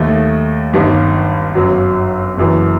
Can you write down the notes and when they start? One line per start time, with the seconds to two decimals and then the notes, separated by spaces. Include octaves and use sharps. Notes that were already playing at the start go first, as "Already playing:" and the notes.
Already playing: D#2 D#3 A3
0.73 G1 G2 D#3 G3
1.55 G1 F#2 F#3
2.37 F#1 F#2 E3